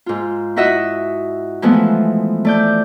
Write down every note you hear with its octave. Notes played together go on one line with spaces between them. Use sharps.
G#2 F4
E4 F#4 D#5 E5 F#5
E3 F3 G#3 A3 B3
A3 D5 G6